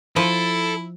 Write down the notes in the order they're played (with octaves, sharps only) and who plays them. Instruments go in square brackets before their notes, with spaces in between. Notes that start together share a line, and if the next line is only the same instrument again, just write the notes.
[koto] F3 [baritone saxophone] E4 [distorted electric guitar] A4